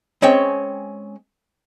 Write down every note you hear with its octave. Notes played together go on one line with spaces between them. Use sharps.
G#3 C4 C#4 C#5 G5